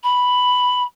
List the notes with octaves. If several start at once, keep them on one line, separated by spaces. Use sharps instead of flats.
B5